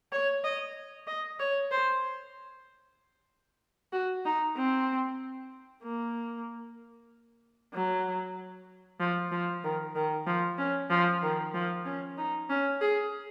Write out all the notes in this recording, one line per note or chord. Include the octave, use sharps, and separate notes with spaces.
C#5
D#5
D#5
C#5
C5
F#4
D#4
C4
A#3
F#3
F3
F3
D#3
D#3
F3
C#4
F3
D#3
F3
C#4
D#4
C#4
G#4